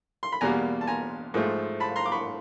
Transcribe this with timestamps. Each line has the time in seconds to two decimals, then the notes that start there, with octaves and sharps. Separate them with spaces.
0.23 C6
0.32 B5
0.41 E2 B2 G3 A#3 G#5 A#5
0.81 A5
0.87 G#5 A#5
1.34 G#2 F3 A3
1.80 A5 B5
1.96 A#5 C6
2.06 D6
2.12 B5 C#6